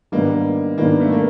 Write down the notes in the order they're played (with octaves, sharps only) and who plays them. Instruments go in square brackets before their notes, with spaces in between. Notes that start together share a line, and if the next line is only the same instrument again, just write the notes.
[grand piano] G#2 D#3 G3 B3 D4 [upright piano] A#3
[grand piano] G#2 D#3 G3 B3 D4 [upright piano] A#3
[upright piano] A3
A#3